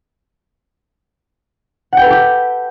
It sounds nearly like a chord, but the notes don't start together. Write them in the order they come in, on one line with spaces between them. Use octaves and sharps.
F#5 G5 B4 A4 G4